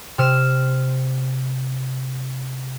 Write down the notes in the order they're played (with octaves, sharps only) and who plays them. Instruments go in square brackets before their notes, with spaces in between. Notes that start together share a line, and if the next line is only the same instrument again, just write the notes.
[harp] C3 F6 E7